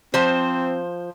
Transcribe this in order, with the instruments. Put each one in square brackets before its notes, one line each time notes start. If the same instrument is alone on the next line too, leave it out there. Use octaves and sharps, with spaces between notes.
[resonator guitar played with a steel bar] F3 C5 [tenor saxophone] C4